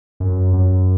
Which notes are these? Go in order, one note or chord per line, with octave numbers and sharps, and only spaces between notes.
F#2
F#2